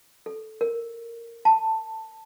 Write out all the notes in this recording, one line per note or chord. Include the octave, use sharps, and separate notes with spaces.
A4
A#4
A5